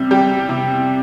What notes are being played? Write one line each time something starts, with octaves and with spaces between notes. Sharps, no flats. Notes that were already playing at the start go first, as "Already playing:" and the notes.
Already playing: C3 G3
G3 G4
C3